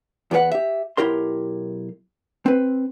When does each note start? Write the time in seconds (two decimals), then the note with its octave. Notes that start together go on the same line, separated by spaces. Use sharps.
0.31 E2 B3 G4 G#4 B4 F#5
0.52 G4 E5
0.97 B1 E4 G4 A#4 C6
2.46 C4 B4